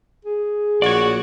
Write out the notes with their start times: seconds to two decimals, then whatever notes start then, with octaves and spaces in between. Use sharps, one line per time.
0.25 G#4
0.82 A#1 F#4 C#5 D5